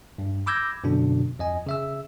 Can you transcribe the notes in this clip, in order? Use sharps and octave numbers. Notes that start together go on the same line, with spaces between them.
G2
B5 D6 E6 G6 G#6 A#6
F#2 B2 D3 D4
F2 D#5 G#5
C#3 E5 E6